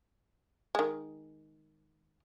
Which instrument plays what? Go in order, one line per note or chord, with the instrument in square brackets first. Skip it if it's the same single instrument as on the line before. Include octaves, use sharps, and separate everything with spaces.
[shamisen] D#3 G#3